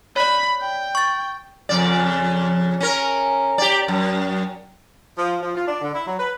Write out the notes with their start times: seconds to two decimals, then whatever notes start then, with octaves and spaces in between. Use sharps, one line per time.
0.16 C#5 D5 B5
0.61 G5
0.95 C#6 A6
1.69 F2 C#3 D5
2.80 C#4 A#4
3.58 G4 D5
3.88 F#2
5.18 F3
5.42 F3
5.55 F4
5.67 D4
5.81 D3
5.94 E4
6.07 F#3
6.19 B4